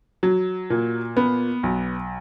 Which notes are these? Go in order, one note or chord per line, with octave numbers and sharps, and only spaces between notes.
F#3
A#2
B3
B1